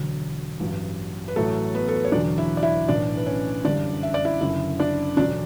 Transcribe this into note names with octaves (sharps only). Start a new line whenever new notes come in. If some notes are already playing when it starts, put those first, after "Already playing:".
Already playing: E1 D2 D3 F#3
A1 G2 F#3
B4
A1 A2 F#3 A3 A4
B3 B4
A4
B4
C#5
E1 E2 D3 F#3 D4 D5
E4 E5
D5
E4 E5
B1 A2 E3 D4 D5
B4
C#4 C#5
G1 F#2 E3 G3 D4 D5
E5
D5
E4 E5
F#1 F#2 D3 E4 E5
D4 D5
E1 D2 D3 F#3 D4 D5